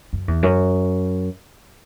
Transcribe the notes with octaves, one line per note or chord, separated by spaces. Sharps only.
F#2
E2
F#2